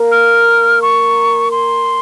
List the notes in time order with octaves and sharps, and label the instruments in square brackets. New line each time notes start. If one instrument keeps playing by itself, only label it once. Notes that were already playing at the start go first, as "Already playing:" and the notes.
Already playing: [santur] A#3 A#4
[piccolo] F6
C#6
C6